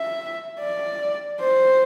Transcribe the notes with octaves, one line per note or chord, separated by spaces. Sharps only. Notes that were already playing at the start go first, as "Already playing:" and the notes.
Already playing: E5
D5
C5